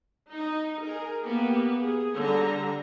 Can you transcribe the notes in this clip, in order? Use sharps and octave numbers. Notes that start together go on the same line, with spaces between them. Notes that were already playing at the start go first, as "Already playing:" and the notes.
D#4
G#4 A#4
A#3 B3 G4
G#4
D3 G3 A#5